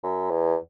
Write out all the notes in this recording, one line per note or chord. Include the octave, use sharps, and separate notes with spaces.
F#2
E2